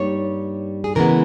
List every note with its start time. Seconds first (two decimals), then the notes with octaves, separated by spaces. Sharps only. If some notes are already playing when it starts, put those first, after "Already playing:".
Already playing: G2 G3 A#3 D#4 C#5
0.84 G#4
0.95 C#3 E3 G#3 B3 A#4